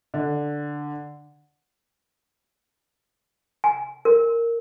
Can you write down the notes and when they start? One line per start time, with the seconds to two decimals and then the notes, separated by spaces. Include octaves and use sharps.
0.14 D3
3.64 G#5
4.05 A#4